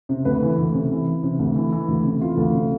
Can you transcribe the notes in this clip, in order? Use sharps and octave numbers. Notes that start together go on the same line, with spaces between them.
C3
D2 B4
E3
D2
C3
E3
E3
C3
D2
E3
E3
D2
C3
E3 F4
D2
C3